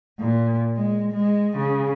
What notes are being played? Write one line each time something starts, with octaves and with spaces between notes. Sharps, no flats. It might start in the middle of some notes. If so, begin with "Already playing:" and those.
A#2
G#3
G#3
C#3